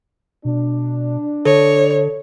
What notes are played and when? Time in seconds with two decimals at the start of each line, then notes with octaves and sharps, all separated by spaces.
0.45 B2 D4
1.45 D3 A4 C#5